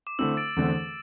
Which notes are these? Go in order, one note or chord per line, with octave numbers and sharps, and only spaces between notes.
D6
D3 A3 C4 E4 E6
A6 D7
E2 D3 A3 C4